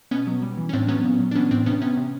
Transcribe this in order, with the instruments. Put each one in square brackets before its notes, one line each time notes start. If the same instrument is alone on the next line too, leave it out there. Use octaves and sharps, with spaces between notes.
[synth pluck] B2 B3 C#4
F#3
G3
E3
C#4
A2 C4 D4
F#3 B3 C#4
A#2
F#3
D4
E3 B3 C#4
A2 C4 D4
C3 B3 C#4
C3 B3 C#4
C3